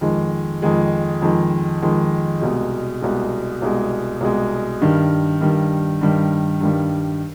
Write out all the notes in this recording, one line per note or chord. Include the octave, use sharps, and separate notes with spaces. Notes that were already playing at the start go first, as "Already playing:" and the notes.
F2 D#3 G#3
F2 D#3 G#3
F2 D#3 G#3
F2 D#3 G#3
C2 B2 G#3
C2 B2 G#3
C2 B2 G#3
C2 B2 G#3
G2 D#3 G3
G2 D#3 G3
G2 D#3 G3
G2 D#3 G3